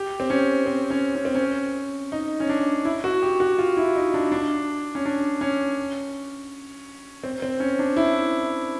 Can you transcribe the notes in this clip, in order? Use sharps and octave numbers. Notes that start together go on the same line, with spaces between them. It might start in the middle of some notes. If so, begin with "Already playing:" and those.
Already playing: G4
C4
C#4
C4
C#4
C#4
C4
C#4
D#4
C#4
D4
E4
F#4
G4
F#4
F4
E4
D#4
D4
D4
C#4
D4
C#4
C4
C4
C#4
D4
E4